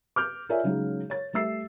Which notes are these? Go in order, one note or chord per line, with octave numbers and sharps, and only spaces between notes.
D6 F6 G6
F4 A#4 C#5 D5 E5 G#5
C#3 F#3 G#3 D#4 F#4
C#5 A6
G3 A3 E5 E6 C7